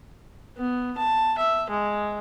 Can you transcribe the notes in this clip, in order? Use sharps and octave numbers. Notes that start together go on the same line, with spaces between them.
B3
A5
E5
G#3